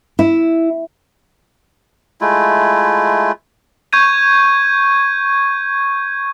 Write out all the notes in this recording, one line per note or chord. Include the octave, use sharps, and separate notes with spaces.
E4
G#3 A3 E4 F4
C#6 G6 G#6 D#7